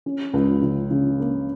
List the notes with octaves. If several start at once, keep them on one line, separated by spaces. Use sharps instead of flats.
C#4
C#2
C#3
C#3
A#3